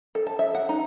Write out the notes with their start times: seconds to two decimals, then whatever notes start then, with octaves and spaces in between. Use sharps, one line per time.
0.15 A4
0.27 A5
0.39 E5
0.55 F#5
0.69 D#4